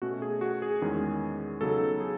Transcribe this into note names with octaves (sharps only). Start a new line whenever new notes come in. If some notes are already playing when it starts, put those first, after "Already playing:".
B2 A3 C#4 F#4
G#4
F#4
G#4
E2 D#3 G#3 C#4
C#3 F#3 B3 D#4 A4
G#4